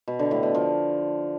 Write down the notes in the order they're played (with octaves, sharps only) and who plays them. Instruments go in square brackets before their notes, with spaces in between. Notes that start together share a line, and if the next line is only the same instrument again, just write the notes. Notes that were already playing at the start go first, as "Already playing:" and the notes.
[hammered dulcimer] B2
D3
A2
B2
F3